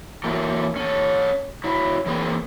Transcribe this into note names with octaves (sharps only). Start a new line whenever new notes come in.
E3 F#3 A#3 A4
C#4 A4
F#3 E4
E3 A#3 C4 G#4